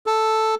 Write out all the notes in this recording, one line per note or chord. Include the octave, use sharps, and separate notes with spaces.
A4